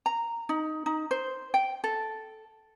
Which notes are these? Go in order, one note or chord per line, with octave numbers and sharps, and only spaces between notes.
A#5
D#4
D#4
C5
G5
A4